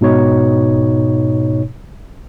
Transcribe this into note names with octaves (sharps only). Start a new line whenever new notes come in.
G#2 B2 D#4 C#5